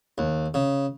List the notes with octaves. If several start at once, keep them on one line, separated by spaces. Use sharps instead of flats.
D#2
C#3